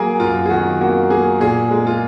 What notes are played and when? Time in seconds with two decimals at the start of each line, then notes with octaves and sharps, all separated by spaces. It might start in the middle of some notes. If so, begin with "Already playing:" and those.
Already playing: F#3 A#3 G#4 A#4
0.20 F#2 F4
0.46 G#4
0.50 D#3 F#4
0.81 A#3 F#4
1.10 A#3 G#4
1.40 A#2 G#4
1.71 G#3
1.87 F4